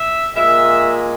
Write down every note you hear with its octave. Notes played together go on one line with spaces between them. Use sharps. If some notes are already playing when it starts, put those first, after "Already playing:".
Already playing: E5
A#2 G#3 E5